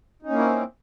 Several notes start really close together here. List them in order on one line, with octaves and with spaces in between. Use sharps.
D#4 C#4 A#3 E4 C4